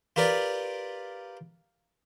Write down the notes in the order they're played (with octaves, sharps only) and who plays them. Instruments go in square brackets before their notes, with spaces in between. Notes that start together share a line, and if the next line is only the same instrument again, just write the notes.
[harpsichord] F4 G4 A#4 B4 D5